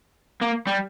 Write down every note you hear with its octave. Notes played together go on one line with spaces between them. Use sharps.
A#3
G3